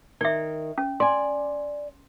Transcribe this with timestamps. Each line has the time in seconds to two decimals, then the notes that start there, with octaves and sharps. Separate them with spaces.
0.21 D#3 D5 E5
0.78 C#4
1.00 D5 G#5 C6